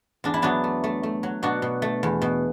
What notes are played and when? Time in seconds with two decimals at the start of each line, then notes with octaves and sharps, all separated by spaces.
0.24 E2 D4
0.34 E4
0.42 F#3 B3 D4
0.64 A3
0.84 A3
1.03 A3
1.23 F#3
1.43 B2 D4 F#4
1.62 B2
1.82 A3
2.03 E2
2.22 B2